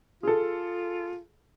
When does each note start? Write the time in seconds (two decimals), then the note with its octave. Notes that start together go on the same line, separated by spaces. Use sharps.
0.23 F4 G#4 A4